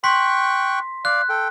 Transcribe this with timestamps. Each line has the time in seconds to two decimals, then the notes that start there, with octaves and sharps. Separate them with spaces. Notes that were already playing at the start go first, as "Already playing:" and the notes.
0.04 G5 C6 C#6 F#6 B6
1.05 D5 F5 F#6
1.29 A4 G5